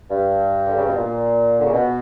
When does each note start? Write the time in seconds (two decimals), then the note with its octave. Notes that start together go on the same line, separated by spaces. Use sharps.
0.11 G2
0.66 D3
0.76 C#3
0.86 B2
0.96 A#2
1.58 D3
1.64 C#3
1.72 B2